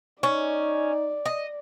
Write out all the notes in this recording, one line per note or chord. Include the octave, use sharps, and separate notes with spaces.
C#4 D#4 D5
D#5